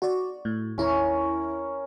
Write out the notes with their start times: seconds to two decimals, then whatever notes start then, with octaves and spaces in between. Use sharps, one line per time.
0.02 F#4 D5 C#6
0.45 A2
0.78 D#2 C#4 E4 A#4 C#5